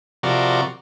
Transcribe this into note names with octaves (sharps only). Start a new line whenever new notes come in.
C3 F3 F#4 A#4 D5